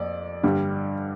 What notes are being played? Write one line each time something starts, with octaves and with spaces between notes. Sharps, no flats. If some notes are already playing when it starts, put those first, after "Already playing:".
Already playing: F2 D5
G2 D3 G3